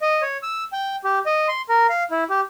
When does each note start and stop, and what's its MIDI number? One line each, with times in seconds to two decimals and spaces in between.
0.02 0.22 75
0.22 0.37 73
0.43 0.64 88
0.73 0.96 79
1.04 1.19 67
1.26 1.48 75
1.48 1.62 84
1.69 1.87 70
1.89 2.04 77
2.11 2.24 64
2.30 2.41 67